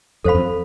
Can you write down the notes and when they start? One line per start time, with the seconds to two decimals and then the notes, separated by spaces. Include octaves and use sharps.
0.24 F2 A4 C5 F5 B5
0.35 F2